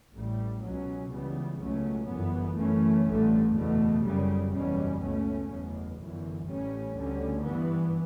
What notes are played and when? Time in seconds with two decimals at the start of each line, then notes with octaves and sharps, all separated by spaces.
0.14 A1 A2 G3
0.62 C#2 B2 F#3 C#4
1.11 C#2 C#3 E3 G3 B3
1.59 C#2 B2 F#3 A3 C#4
2.08 G1 F#2 E3 B3
2.57 F#2 E3 A3 C#4
3.06 A1 G2 D3 A3
3.54 F#1 E2 B2 A3
4.03 G1 F#2 C#3 G3
4.53 F#1 E2 B2 G3 C#4
5.01 C#2 B2 A3 C#4
5.50 F#1 E2 B2
5.98 G1 F#2 E3
6.47 A1 A2 G3 C#4
6.96 D2 D3 G3 C#4
7.44 G2 E3 B3